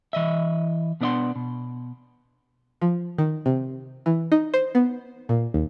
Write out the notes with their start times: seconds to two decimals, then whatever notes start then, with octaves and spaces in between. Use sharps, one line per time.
0.13 E3 D#5 E5
1.01 B2 B3 D4 D#5 F#5 C6
1.36 B2
2.81 F3
3.18 D#3
3.46 C3
4.06 E3
4.32 D#4
4.54 C5
4.75 B3
5.29 A#2
5.54 D#2